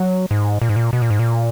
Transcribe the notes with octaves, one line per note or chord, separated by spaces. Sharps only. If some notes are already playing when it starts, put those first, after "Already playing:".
Already playing: F#3
G#2
A#2
G#2
A#2
B2
A#2
G#2
A#2